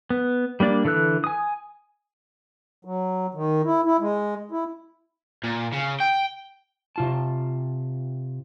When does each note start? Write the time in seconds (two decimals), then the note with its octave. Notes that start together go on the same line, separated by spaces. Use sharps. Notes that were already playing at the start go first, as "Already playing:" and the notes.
0.10 B3
0.60 G3 A#3 D4 D5
0.85 D3 E3 A4 E6 F#6
1.24 G#5 D#6
2.85 F#3
3.35 D#3
3.65 E4
3.85 E4
4.00 G#3
4.51 E4
5.44 A#2
5.72 C#3
6.00 G5
6.96 C3 F4 A5